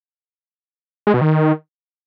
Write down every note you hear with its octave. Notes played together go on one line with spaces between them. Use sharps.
G#3
B2
D#3